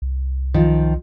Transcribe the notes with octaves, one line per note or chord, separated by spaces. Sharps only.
C2
D#3 F3